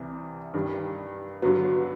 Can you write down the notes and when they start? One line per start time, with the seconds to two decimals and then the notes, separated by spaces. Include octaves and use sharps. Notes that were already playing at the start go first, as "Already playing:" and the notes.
Already playing: C2 C3 E3 G3
0.54 G2 D#3 G3
1.42 G2 D3 F#3 B3 F#4